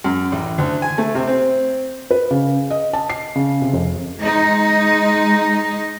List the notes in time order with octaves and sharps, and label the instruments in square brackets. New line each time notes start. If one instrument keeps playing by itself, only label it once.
[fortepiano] F#2
A1
D2
G#5
A3
C3
C4
[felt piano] B4
C#3
D#5
A5
C7
C#3
C3
F1
[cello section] G#3 D#4